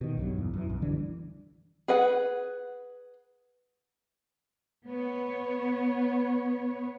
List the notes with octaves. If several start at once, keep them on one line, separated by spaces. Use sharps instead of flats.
B2 D#3
B1 G2 F#3
E2
F#2 E3
B1 F#2
D3 E3 G3 D4
G#4 B4 F#5
B3 C#5